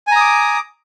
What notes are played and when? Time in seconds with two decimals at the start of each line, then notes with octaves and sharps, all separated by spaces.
0.07 G#5
0.12 A#5
0.16 D#6
0.21 D6